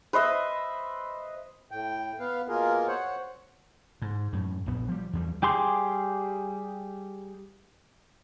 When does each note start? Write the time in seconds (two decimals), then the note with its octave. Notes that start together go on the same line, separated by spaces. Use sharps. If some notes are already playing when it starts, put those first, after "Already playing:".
0.13 B4 C5 D#5 E5
1.71 A2 G5
2.19 B3 B4 F5
2.48 B2 A#3 F4 G#4 A#4
2.88 C5 C#5 F#5
4.02 G#2
4.33 F#2 A2
4.66 A#1 B3
4.88 F3 G3
5.13 E2 F3 G3
5.42 G3 G4 G#4 C6 D6